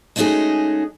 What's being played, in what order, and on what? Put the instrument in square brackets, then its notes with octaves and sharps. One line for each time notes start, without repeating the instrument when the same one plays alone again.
[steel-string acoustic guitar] G#3 A3 C#4 D#4 F#4 G#4